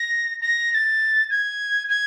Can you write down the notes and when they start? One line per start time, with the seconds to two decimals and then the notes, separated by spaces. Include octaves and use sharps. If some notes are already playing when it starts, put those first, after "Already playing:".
Already playing: A#6
0.41 A#6
0.71 A#6
0.74 A6
1.30 G#6
1.89 G#6